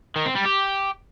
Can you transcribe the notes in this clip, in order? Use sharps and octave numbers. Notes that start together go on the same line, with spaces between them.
D#3
C4
G3
G4